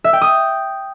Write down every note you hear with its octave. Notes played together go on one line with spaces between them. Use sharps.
E5
G5
D#6